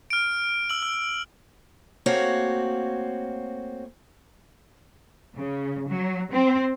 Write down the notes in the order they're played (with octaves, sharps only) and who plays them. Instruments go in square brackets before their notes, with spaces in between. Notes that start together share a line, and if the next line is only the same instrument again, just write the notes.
[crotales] F6 D7
E6 F#7
E6
[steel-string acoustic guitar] A3 A#3 C4 F#4 C#5 F5
[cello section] C#3
F#3
C4